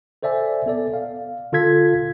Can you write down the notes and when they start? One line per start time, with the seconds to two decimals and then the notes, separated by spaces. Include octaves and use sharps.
0.23 A4 C5 D5 E5 G#5
0.66 B3 A4 D5
0.94 F5
1.52 D3 F4 A4 F5 G#6 B6